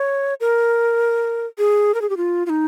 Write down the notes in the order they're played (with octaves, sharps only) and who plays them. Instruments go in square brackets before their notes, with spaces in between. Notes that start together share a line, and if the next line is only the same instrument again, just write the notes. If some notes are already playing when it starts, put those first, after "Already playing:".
Already playing: [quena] C#5
A#4
G#4
A#4
G#4
G4
F4
F4
D#4